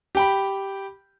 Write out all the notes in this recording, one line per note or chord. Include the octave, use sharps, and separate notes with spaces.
G4 G5 B5